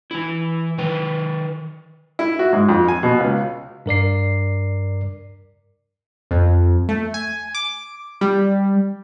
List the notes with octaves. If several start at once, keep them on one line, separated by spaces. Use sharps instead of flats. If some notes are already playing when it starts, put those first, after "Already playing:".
E3 E4
D#3 B4
E4
F#4
G#2
F2
G#5
B2
C#2
G2 A#4 D5 C7
F2
A3
G#5
D6
G3